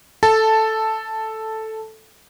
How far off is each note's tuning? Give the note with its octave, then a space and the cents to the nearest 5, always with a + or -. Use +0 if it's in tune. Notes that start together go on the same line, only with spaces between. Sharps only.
A4 +0 A5 +0